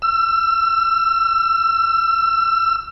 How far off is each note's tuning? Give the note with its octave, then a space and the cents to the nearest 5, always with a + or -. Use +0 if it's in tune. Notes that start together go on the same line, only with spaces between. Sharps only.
E6 +35